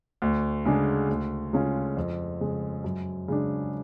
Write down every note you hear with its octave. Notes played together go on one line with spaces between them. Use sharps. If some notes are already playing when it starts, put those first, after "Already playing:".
D2
C#3 G#3 D4
D2
C#3 G#3 C#4 F4
F2
C#3 G#3
F#2
C#3 G#3 D4